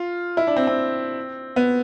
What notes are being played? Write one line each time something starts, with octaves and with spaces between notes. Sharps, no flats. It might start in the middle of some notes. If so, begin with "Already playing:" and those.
Already playing: F4
E4
D4
C4
C4
B3